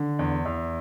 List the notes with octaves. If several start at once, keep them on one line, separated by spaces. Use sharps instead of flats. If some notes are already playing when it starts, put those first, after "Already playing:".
Already playing: D3
E2
E2